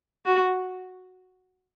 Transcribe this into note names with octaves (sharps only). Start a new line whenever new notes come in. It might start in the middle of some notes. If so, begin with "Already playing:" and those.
F#4